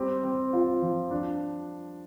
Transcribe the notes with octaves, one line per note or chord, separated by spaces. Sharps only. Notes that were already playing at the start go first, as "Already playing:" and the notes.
Already playing: G3 C4 G4
C4
F4
F3
D4